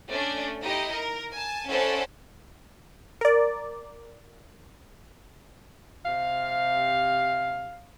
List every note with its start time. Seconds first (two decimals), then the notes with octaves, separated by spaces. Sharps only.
0.11 A3 C#4 D4 D5
0.62 D#4 E4 G4 D#5
0.93 A#4
1.33 G#5 A5
1.68 C#4 E4 A4 C5 D5 F#5
3.21 A#4 D5
6.06 C3 F5